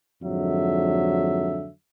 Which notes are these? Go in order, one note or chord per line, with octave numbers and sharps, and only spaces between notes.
F2 G#2 D3 F#3 E5